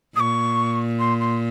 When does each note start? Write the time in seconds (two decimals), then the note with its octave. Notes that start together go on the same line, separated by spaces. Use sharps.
0.15 A#2 C#6 D#6
0.99 C6
1.20 C6